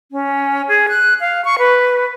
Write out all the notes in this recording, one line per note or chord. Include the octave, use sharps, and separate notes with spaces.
C#4
G#4
F#6
F5
C#6
B4